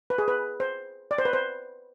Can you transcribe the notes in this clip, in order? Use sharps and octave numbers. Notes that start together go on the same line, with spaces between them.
B4
G#4
B4
C5
D5
C5
B4
C5